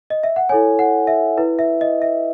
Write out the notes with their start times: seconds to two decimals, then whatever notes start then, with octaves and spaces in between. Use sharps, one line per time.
0.10 D#5
0.23 E5
0.36 F#5
0.49 E4 A4 C#5 G#5
0.79 F#5
1.07 E5
1.38 E4 B4
1.59 E5
1.81 D#5
2.02 E5